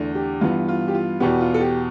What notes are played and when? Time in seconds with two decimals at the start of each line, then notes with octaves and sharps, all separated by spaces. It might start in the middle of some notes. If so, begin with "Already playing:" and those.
Already playing: E2 D3 A3
0.15 G4
0.41 G2 E3 B3 F4
0.68 F4
0.88 G4
0.94 F4
1.20 E2 B2 B3 G4
1.41 F4
1.54 A4
1.61 G4